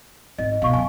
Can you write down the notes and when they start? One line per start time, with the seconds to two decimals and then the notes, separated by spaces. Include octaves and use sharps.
0.38 G#1 D#5
0.62 B2 F5 C#6
0.73 F#2 G#5